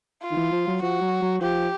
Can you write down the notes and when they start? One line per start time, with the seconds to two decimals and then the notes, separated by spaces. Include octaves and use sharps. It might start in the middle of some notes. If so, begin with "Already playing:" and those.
0.22 F4
0.31 D#3
0.37 E3
0.52 F3
0.67 F#3
0.82 F3 F#4
1.01 F#3
1.22 F#3
1.41 F3 G4